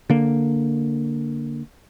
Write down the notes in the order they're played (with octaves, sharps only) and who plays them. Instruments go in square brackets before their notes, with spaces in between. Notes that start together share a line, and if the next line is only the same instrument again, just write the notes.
[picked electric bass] D3 A#3